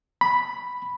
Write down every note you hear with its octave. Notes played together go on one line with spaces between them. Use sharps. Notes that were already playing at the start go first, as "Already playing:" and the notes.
B5